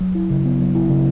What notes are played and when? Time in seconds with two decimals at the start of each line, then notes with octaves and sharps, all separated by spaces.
0.01 F#3
0.15 E4
0.30 C#3
0.45 B3
0.60 F#3
0.75 E4
0.89 C#3